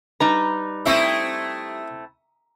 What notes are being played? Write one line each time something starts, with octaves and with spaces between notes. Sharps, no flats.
G3 D#4 B4 A#5
A3 C4 E4 E5 C#6 D#6